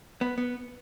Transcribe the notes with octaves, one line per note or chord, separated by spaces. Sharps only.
B3
B3